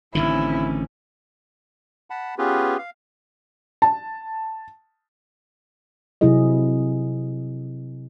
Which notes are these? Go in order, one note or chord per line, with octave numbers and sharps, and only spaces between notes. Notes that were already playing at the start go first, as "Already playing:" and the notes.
A1 D3 D#3 C4 C#4 E4
F#5 A5 B5
B3 C#4 F4 G4 G#4 B4
F5
A5
C3 F#3 C4 E4 G#4 D#5